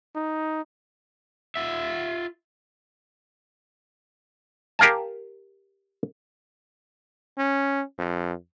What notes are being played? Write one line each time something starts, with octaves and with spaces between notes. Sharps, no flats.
D#4
F4 E5
G4 A#4 F5 G#5 A5
C#4
F2